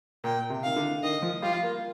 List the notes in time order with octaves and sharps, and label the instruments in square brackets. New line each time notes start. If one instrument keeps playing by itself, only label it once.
[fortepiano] A#2 [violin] G5
[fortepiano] C3
[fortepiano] D#3 [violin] F5
[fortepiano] D3
[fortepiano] D#3 [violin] D#5
[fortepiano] F3
[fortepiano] G3 [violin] F4
[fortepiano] A#3